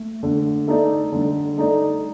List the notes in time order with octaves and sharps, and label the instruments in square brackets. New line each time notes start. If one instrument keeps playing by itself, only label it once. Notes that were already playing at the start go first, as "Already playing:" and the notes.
Already playing: [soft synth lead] A3
[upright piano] D3
A3 D#4 A4 D5
[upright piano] D3 [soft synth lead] G3
[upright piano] A3 D#4 A4 D5